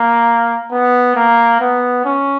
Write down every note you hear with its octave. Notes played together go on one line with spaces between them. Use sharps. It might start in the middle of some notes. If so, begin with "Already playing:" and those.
Already playing: A#3
B3
A#3
B3
C#4